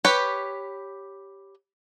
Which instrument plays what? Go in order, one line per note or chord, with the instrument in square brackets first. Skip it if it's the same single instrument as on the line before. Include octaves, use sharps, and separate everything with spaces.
[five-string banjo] G4 B4 C#5